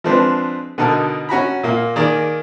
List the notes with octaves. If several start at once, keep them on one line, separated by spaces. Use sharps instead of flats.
F3 G#3 C4 D4 B4
B2 D3 D#4 A4 A#4
C#4 F#4 A#5 B5
A#2 A#3 F5
D#3 A#3 G#4 A#4 D5